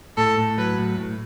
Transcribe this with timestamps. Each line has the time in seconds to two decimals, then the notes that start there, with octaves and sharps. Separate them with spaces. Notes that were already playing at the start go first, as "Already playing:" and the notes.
0.17 A2 A4
0.37 A2
0.58 F#3 B4
0.78 A2
0.98 A2